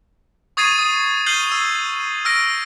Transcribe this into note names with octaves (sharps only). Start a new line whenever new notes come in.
C#6 D#6 G#6 A6 C7 D#7
D#6
F6 G6 C7 D#7 F#7 G7
E6
E6 F6 A#6 D7